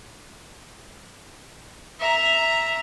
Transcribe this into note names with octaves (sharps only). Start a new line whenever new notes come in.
E5 A#5